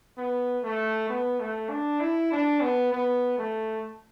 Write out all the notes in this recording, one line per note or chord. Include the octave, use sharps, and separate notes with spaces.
B3
A3
B3
A3
D4
E4
D4
B3
B3
A3